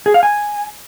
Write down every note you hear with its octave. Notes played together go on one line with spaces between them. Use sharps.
G#4
F5
G#5